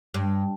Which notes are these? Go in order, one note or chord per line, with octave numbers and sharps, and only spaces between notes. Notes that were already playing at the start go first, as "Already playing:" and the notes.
G2